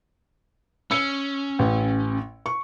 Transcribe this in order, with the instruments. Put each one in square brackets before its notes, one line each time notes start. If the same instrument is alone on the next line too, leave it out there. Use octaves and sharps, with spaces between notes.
[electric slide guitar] C#4 [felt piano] E6 C#7
[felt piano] A1
C#6